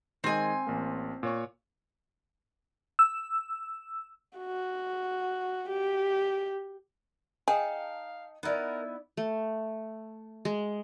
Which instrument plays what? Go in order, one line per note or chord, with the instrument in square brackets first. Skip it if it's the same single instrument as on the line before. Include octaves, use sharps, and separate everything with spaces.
[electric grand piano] D#3 G#3 D#5 [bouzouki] C4 G#5
[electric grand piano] A1 A#3
A#2 C#5 C#6
[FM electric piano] E6
[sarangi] F#4
G4
[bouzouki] D#4 G5 A5 [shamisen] G#4 [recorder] F5
[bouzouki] B3 E4 [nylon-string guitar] D#4 D5 [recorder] A#4
[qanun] A3
G#3